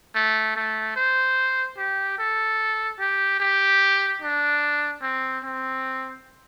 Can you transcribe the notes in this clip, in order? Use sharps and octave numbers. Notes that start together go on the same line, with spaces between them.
A3
A3
C5
G4
A4
G4
G4
D4
C4
C4